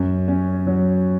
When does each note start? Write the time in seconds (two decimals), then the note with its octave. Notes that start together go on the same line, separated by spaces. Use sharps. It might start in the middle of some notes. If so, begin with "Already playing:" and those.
Already playing: F#2
0.28 C#4
0.66 F#3